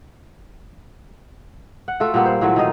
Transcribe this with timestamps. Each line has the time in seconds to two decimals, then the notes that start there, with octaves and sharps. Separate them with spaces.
1.88 F#5
2.00 A3 F4 F#4 A4
2.14 A#2 G3 A#3 B3
2.26 C5
2.41 A#2 E3 F#3 A3
2.56 D#3 D#4 D#5 F5